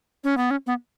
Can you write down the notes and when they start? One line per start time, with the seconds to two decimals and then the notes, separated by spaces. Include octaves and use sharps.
0.24 C#4
0.37 B3
0.51 C#4
0.67 B3